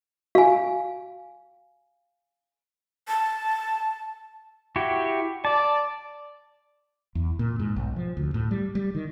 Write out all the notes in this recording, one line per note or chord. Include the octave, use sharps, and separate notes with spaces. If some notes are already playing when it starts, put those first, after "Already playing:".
F#4 F5 G#5
A5
E4 F#4 G4
D5 A5
E2
A#2
G#2
B1
F3
D2
A2
G3
G3
D#3